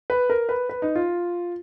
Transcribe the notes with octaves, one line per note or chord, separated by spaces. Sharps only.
B4
A#4
B4
B4
D#4
F4